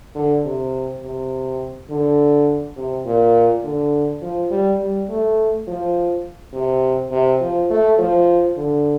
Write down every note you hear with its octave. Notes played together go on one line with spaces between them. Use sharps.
D3
C3
C3
D3
C3
A#2
D3
F3
G3
G3
A3
F3
C3
C3
F3
A3
F3
D3